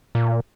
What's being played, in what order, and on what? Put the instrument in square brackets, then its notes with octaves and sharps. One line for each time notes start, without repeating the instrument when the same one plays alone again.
[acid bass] A#2